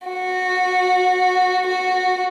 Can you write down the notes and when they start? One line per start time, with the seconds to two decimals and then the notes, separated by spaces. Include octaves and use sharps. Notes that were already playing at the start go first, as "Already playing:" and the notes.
0.08 F#4
1.67 F#4